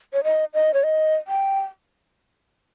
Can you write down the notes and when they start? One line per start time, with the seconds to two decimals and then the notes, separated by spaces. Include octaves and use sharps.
0.13 C#5
0.24 D#5
0.54 D#5
0.74 C#5
0.84 D#5
1.28 G5